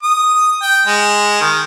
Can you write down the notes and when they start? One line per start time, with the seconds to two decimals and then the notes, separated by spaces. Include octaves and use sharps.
0.03 D#6
0.62 G5
0.86 G#3
1.41 D#3